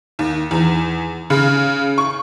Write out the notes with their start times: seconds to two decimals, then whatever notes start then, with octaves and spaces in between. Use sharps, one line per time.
0.19 D#2
0.51 E2
1.30 C#3
1.98 C#6